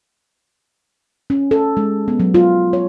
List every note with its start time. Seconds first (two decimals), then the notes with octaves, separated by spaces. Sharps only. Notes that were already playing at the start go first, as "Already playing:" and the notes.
1.30 C#4
1.51 A4
1.77 G#3
2.08 B3
2.20 F#3
2.34 F4
2.73 C#5